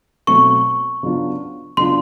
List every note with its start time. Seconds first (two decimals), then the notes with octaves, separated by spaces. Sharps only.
0.27 B2 F#3 A3 C4 C#6
1.03 C#3 F#3 B3 D4 F4
1.77 C#3 F#3 B3 D4 F4 C6